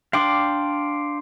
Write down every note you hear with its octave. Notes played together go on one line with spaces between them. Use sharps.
D4 F5 G5 C6 D6